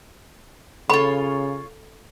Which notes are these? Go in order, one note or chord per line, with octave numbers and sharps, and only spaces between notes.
C#3 F4 A4 C#5 B5